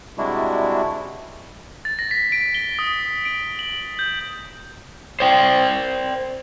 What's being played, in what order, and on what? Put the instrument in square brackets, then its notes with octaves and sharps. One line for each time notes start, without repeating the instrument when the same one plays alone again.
[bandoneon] C3 G3 G#3 D4 E4 F#4
[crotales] A6
A#6
B6
D7
G7
D#6
D7
F#7
G6
[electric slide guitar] C5 D5 G5